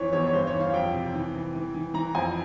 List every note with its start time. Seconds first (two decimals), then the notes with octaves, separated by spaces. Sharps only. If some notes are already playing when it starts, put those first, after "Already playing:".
Already playing: F2 E3 C#5
0.13 E2 C#5
0.27 C#5
0.33 G2 C5
0.47 C#5
0.54 E3
0.60 F5
0.73 F2 G5
0.93 C3
1.14 E3
1.34 E3
1.55 E3
1.74 E3
1.94 E3 A#5
2.15 F2 G#5